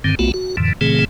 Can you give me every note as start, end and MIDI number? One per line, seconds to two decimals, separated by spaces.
0.04 0.15 43
0.04 0.15 50
0.04 0.15 51
0.04 0.15 60
0.19 0.32 35
0.19 0.32 57
0.19 0.32 59
0.19 0.32 65
0.19 0.32 66
0.34 0.56 66
0.57 0.73 41
0.57 0.73 45
0.57 0.73 50
0.57 0.73 52
0.81 1.05 46
0.81 1.05 49
0.81 1.05 52
0.81 1.05 57
0.81 1.05 60
0.81 1.05 68